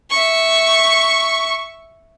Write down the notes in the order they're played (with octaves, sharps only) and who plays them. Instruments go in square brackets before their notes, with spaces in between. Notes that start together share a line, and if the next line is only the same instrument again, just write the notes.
[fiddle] E5 C#6